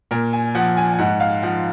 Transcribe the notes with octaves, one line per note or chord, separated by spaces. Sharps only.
A#2 A#4
G#5
F3 F#5
G#5
G#5
G#2 F#5
F5
F3 F#5